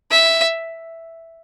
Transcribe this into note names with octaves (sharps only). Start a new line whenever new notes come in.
E5